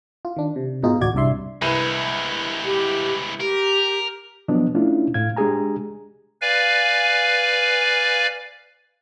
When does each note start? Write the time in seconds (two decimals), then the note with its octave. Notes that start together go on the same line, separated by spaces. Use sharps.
0.25 F4
0.36 D#3 D4
0.56 C3
0.83 G#2 B2 D#4 F4 G#4
1.01 A1 D2 F#4 D5 G#6
1.15 C2 G2 D5 E5 C6
1.62 C2 G#3 E4 B4 D#7
2.65 G4
3.40 G4 A#4
4.48 F3 F#3 B3 D4 D#5
4.75 A3 C#4 D4 E4 F4
5.14 A2 F5 G#6
5.37 G#3 D4 G4 G#4 G#5 A#5
6.41 B4 D5 F5 G#5